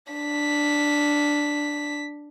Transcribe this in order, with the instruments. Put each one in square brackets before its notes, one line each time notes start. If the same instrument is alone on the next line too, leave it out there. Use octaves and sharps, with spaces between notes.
[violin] D4 B6